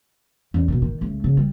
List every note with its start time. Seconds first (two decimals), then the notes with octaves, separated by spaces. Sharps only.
0.54 E2 C#4
0.68 B2 D#3
0.82 D#3
1.01 C#2 A3
1.24 C#3
1.37 G3